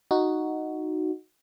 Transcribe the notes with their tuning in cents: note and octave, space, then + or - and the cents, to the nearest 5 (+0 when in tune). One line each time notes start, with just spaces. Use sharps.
D#4 +0 F#4 +0